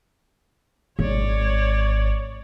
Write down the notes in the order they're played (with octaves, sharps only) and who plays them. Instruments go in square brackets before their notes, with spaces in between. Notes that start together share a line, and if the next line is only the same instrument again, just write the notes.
[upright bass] G#1 [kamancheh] C#5 D5